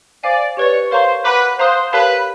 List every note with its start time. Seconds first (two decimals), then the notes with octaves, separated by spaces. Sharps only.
0.23 C5 D5 F5 G#5
0.57 G4 B4 C#5 D5
0.91 A#4 C5 C#5 F5 A#5 C#6
1.25 B4 F#5 A#5 D6
1.59 C5 F5 A#5 D#6 F#6
1.93 G4 A#4 B4 C#5 F5 A5